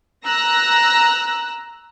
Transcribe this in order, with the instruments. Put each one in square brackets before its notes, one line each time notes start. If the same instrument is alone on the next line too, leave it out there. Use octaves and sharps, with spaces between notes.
[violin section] A#5 E6 F#6 A#6